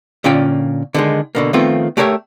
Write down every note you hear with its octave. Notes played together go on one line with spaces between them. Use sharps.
A#2 D3 C#4 F4 G5
D3 D#3 G#3
B2 D3 A#3
D#3 F3 A3 B3 C4 F4
A3 G4 A#4 C#5 D5 E5